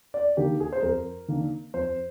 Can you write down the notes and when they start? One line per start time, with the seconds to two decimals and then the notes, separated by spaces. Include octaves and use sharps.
0.14 D5
0.37 D#3 A#3 D4 G4
0.60 G#4
0.72 C5
0.83 F2 A#4
1.28 D#3 A#3 D4
1.74 F2 C5